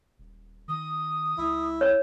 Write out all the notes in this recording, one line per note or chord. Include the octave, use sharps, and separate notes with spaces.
D#1
D#3 D#6
C#2 E4
C#5